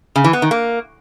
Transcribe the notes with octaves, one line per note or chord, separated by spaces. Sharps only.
C#3
E3
B3
D#3
A#3